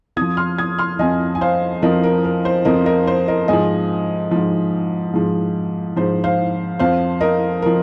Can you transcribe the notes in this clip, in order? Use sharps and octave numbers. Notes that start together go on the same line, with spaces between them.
F2 F3 D#6 G#6
C6 F6
D#6 G#6
C6 F6
F2 F3 D#5 G#5
G#5
C5 F5
F2 F3 A#4 D#5
A#4
A#4
C5
F2 F3 A#4 D#5
A#4 D#5
C5
A#4 D#5
G#2 F3 D#5 G#5
G#2 F3
G#2 F3
G#2 F3 C5
C5 F5
F2 F3 C5 F5
A#4 D#5
F3 A#4